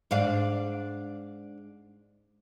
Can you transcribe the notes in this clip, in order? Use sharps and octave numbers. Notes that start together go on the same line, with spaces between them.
G#2 D4 F5